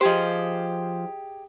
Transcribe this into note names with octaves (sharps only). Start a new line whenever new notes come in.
F3 G4 G#4 C5 D#5